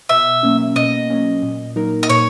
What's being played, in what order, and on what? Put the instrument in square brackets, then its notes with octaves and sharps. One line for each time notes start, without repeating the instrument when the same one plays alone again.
[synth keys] B2 [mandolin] E5
[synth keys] F#3 A#3 C#4
[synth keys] B2 [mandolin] D#5
[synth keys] F#3 A#3 C#4
A#2
F#3 A#3 D#4 A#4
[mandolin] D#5
[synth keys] A#2 [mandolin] C#5